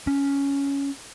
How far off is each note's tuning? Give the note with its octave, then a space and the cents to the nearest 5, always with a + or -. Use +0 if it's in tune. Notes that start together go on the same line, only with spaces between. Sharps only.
C#4 +10